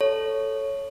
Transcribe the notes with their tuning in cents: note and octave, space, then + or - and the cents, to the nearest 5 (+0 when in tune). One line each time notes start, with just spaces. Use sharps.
A4 +0 C#5 +0